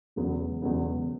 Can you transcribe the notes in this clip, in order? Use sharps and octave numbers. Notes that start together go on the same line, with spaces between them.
E1 E2 C#3 F#3 B3
E1 E2 C#3 F#3 B3